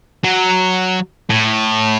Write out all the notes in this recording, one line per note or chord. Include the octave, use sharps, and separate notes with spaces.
F#3
A2